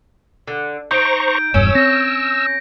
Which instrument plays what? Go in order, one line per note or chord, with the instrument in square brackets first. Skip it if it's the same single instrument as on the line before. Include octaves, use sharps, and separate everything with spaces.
[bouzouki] D3
[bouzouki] D#4 [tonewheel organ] C5 A#5 C#6 [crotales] G6 D7
[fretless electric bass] E1 E2 G2 [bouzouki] C#4 [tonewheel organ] E6
[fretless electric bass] C4 [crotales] A#6